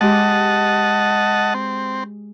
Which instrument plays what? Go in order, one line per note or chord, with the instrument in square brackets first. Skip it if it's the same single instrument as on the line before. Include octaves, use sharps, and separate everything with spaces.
[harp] G#3 G4 [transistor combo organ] D#5 F#5 A5
[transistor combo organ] C4